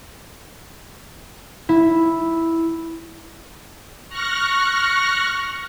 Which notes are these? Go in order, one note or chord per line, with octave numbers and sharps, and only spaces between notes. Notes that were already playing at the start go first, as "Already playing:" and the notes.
E4
C#6 F6 F#6 A#6